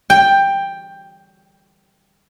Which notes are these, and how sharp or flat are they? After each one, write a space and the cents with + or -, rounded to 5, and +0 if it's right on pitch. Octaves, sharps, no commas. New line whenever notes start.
G5 +10